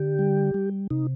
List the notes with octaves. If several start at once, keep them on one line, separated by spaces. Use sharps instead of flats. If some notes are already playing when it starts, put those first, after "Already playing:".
Already playing: D3 G4
G3
G3
C3 D#4